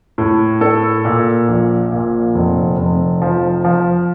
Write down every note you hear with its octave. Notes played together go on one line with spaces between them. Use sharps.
A2
A4
A#2
A#1
A#2
F1
F1
F3
F3